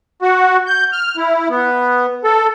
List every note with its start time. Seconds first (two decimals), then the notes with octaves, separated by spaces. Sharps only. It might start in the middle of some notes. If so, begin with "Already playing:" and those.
0.22 F#4
0.67 G6
0.92 F6
1.17 E4
1.50 B3
2.24 A4